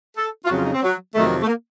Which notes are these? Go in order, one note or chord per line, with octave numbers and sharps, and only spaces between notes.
A4
F4
F2 C#3 F#3 F#4
F4
D#4
C4
F#3
F2 C3 D#3 F#3 A3
A3
A#3